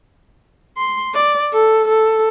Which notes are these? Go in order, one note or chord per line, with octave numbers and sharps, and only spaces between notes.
C6
D5
A4
A4